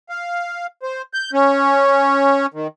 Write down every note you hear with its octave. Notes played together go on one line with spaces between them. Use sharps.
F5
C5
G6
C#4
D#3